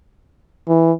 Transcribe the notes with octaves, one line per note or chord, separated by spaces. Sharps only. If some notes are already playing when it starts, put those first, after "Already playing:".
E3